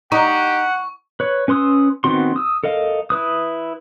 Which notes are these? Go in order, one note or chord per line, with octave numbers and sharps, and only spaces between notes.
D#4 G4 F#5 C#6
B4 C#5
C#4 B4 C6 D#6 E6
D#3 B3 C4 F#4 C6
D#6 E6
A4 A#4 D#5 F5
E4 B4 D#6